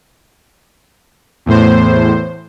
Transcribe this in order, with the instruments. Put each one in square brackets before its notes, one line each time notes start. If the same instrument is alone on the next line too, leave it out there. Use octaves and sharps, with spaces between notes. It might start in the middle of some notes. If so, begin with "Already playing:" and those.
[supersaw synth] E2 A2 C5